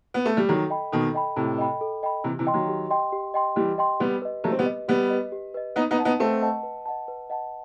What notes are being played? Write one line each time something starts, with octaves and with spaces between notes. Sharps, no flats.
B3
A3
G3
D#3 F#3 A4
D#5 G5 B5
B2 D#3 A4
D#5 G5 B5
A2 C3 A4
D#5 G5 B5
A4
D#5 G5 B5
C3 E3 G4
C3 E3
D#5 G5 C6
D#3 F#3
G4
D#5 G5 C6
G4
D#5 G5 C6
E3 G3 G4
D#5 G5 C6
G3 B3 G4
B4 D#5
F#3 A3 G4
C4
G3 B3
B4 D#5
G3 B3 G4
B4 D#5
G4
B4 D#5
B3 D#4 B4
B3 D#4
D#5 F#5 A5
B3 D#4
A3 C4 B4
D#5 F#5 A5
B4
D#5 F#5 A5
B4
D#5 F#5 A5